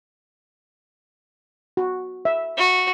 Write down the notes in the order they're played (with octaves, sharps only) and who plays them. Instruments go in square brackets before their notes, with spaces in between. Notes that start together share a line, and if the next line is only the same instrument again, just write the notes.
[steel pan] F#4
E5
[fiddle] F#4